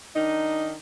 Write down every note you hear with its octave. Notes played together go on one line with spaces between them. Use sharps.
D#3 D4 D#4